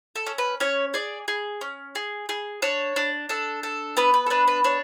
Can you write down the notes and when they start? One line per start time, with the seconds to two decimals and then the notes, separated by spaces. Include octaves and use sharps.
0.15 A4
0.26 C#4
0.38 B4
0.60 C#4 C#5
0.94 G#4 D5
1.28 G#4
1.61 C#4
1.95 G#4
2.29 G#4
2.62 D4 C#5
2.96 D4
3.29 D4 A4
3.63 A4
3.97 B3 B4
4.14 B4
4.26 A4
4.30 D4 B4
4.48 B4
4.64 D4 C#5